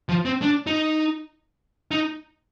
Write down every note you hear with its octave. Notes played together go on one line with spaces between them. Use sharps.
F3
C4
D4
D#4
D#4